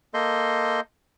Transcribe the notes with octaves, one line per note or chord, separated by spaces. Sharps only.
A#3 A4 D#5 C6 G6